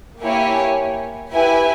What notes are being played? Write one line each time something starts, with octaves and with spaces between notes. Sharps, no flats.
A#3 E4 G4 C#5 G#5
E4 G4 B4 E5 G#5